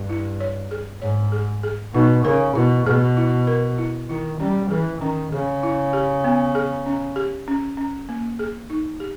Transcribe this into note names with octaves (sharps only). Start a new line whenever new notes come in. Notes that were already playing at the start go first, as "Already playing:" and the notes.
Already playing: G2 G4
E4
C#5
G#4
G#2 C#5
G#4
G#4
B2 D#4
C#3 A#4
B2 E4
B2 G#4
E4
A#4
E4
D#3 E4
G3 C#4
E3 G#4
D#3 C#4
C#3 G#4
E4
G4
B3
G#4
C#4
G4
C#4
C#4
A#3
G#4
D#4
G4